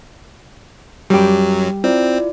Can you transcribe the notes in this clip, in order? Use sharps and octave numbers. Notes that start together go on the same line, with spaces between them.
F#2 F#3 G3 G4
C4 E4 F4 D5